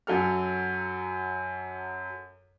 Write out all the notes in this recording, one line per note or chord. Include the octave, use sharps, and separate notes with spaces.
F#2 F#3 A4 F6